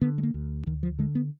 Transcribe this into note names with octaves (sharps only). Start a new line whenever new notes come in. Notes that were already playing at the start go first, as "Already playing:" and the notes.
D3 B3
G#3
A#3
D2
D2 D#3
F3
D3 G#3
B3